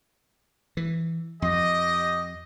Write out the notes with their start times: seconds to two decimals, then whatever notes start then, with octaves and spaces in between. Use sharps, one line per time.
0.77 E3
1.42 F2 G4 D#5